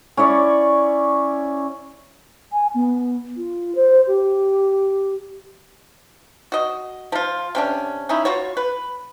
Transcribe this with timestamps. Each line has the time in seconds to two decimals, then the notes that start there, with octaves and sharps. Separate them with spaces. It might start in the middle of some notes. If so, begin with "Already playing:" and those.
0.17 C#4 E4 C#5 D5
2.52 G#5
2.74 B3
3.36 F4
3.74 C5
4.07 G4
6.52 F#4 D#5
7.12 F3 F4
7.55 C3 C#4 D4
8.09 C#4 D#4 E4
8.25 F4 F#4 C#5
8.57 B4